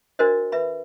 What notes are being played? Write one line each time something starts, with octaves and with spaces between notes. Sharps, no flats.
D4 F#4 A#4 C5 D#5
B4 E5 B5